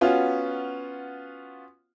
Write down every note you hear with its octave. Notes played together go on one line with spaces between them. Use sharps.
B3 C#4 F4 F#4